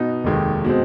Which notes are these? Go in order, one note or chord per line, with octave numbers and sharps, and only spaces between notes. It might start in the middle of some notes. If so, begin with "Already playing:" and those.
Already playing: B2 B3 D#4
F1 D#2 D#3 G#3
B2 G#3 C4